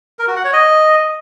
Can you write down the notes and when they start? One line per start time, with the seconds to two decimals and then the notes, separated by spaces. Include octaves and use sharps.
0.19 A#4
0.27 F#4
0.36 F#5
0.45 C#5
0.53 D#5